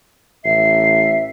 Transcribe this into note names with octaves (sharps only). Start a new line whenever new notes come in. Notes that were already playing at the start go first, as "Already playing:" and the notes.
A1 E5 C7